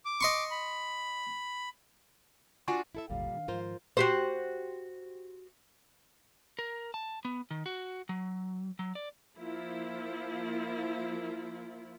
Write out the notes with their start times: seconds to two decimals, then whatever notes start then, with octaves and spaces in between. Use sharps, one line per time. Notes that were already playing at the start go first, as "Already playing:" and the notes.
0.05 D6
0.21 D#5 C6 C#6
0.51 B5
2.68 D4 F4 F#4 F#5 G#5 C#6
2.95 E4 A4 E5
3.10 G#1 D#2 A#2 D3 G3 F5
3.33 D#3 D4
3.48 G#2 D#3 F3 F4 A#4 C5
3.97 F#4 G4 C5
6.59 A#4
6.94 A5
7.25 B3
7.51 D#3
7.66 F#4
8.09 F#3
8.79 F#3
8.95 D5
9.38 F3 A#3 E4 F4